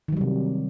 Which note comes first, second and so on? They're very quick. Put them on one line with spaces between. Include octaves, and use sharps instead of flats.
D#3 F#3 G3 C3